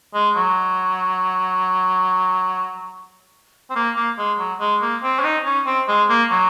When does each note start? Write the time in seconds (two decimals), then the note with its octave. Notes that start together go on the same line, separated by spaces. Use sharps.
0.14 G#3
0.35 F#3
3.70 C4
3.75 A#3
3.96 A#3
4.18 G#3
4.39 F#3
4.60 G#3
4.81 A#3
5.03 C4
5.19 C#4
5.24 D#4
5.45 C#4
5.66 C4
5.88 G#3
6.09 A#3
6.30 F#3